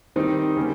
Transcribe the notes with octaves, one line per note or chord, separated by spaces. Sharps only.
D#3 G3 C4 D#4
C#3 G3 A#3